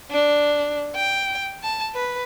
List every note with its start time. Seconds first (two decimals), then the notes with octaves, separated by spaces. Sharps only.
0.11 D4
0.95 G5
1.63 A5
1.94 B4